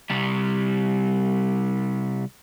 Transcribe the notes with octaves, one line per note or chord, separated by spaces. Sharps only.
C2 G3